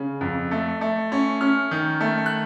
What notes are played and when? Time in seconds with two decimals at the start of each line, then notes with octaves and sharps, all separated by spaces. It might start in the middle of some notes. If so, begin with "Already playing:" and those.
Already playing: C#3
0.21 F2
0.51 A3
0.81 A3
1.12 C#4
1.41 C#4 F6
1.71 D#3
2.01 A3
2.26 F#6